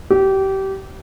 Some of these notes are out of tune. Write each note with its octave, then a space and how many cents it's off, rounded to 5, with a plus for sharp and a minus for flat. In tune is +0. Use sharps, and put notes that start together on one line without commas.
G4 -25